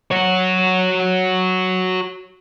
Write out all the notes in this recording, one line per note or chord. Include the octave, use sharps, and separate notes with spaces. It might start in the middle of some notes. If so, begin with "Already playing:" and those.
F#4 C#5